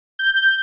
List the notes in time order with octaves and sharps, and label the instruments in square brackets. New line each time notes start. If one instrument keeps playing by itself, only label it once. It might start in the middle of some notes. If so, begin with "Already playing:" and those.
[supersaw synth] G6